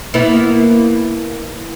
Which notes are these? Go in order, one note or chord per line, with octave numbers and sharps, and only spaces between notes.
A#3 B3 E4